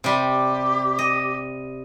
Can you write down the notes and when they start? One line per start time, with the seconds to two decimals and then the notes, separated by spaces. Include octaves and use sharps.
0.04 C3 G3 G4
0.99 D#5